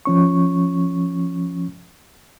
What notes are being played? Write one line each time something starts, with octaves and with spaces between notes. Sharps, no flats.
F3 C#4 C#6